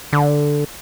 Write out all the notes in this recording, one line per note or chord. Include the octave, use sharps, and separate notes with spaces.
D3